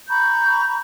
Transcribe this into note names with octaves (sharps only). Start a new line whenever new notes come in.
A#5 B5 C#6 G6